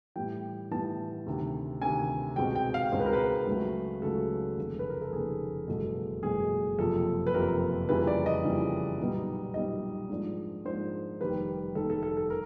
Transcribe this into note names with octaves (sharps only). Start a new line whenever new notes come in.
A2 E3 G3 B3 E4 G5
A2 E3 G3 B3 E4 A5
D2 C3 D#3
D2 C3 D#3 G#5
C#2 B2 G#3 C4 G5
G5
F5
C#2 B2 G#3 C4 C5
B4
A#4
B4
C#2 C#3 F#3 A3
C#2 C#3 F#3 A3 A4
F1 D#2 C#3
B4
A#4
A4
F1 D#2 C#3 G#4
F#1 E2 B2 G#3 A4
F#1 E2 B2 G#3 G#4
F#1 F2 C3 F3 A4
B4
F#1 F2 C3 F3 A#4
F2 C#3 E3 G3 A#3 B4
D5
D#5
F2 C#3 E3 G3 A#3
B1 A#2 G3 B3 D#4
B1 A#2 G3 B3 D#4 D#5
G#2 F3 A#3 D4
G#2 F3 A#3 D4 C5
F1 D#2 D#3 G3 B4
F1 D#2 D#3 G3 A4
A4
A4
A4
A#4